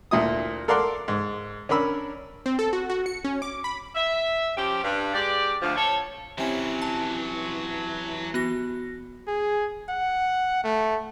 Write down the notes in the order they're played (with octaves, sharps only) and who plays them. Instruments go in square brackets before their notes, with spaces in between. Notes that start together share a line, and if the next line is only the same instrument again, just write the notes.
[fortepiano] D2 A#2 E4 D#6
A4 A#4 D5 F5 F#5 C6
G#2
C#4 D4 A#4 B5 E6
[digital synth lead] C4
A4
F#4
F#4
C#7
C#4
D6
B5
[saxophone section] E5
F3 C#4 G4
G2
G#3 G4 D5
D2 F3
A4 C#5
[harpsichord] C3 C#4 [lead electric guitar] E3 [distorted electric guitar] F#3 C5
[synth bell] A5
B3 F#4 A#6
[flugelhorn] G#4
F#5
A3